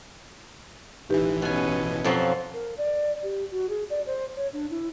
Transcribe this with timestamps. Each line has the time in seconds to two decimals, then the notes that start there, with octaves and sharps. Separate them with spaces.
1.09 A1 E3 D#4 G4 B4
1.42 B2 B3 C#4 G#5
2.04 F2 B2 F3 F#3 C4
2.54 A#4
2.78 D5
3.23 G4
3.52 F#4
3.69 G#4
3.90 D5
4.06 C5
4.36 C#5
4.53 D4
4.70 E4